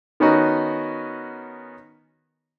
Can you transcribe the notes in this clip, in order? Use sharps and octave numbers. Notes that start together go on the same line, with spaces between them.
D#3 B3 C#4 D#4 F#4 D#5